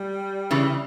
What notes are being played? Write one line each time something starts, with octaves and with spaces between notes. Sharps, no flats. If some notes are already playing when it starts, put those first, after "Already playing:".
Already playing: G3
C#3 E3